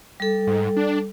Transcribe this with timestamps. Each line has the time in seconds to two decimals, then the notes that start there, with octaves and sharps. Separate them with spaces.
0.20 G3 A4
0.47 G#2
0.77 D4